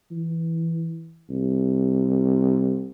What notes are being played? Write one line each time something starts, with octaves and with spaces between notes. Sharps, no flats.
E3
C2